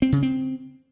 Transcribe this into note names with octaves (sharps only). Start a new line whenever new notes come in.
C4
C#3
C4